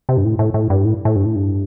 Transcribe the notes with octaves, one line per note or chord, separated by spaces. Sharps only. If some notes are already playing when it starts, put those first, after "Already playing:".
C3
G2
A2
A2
A2
G2
A2
A2
G2
A2
G2